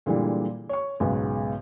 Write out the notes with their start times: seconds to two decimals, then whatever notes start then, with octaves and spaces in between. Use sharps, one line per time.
0.06 A#2 D3 E3 G3 G#3
0.69 C#5 C#6
1.00 B1 G#2 C#3 B3